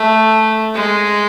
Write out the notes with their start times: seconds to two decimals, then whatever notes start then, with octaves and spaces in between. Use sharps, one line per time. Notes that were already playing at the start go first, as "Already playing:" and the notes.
Already playing: A3
0.74 G#3